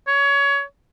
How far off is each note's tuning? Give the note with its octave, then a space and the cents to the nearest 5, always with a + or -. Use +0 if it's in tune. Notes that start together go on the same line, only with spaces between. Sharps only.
C#5 +25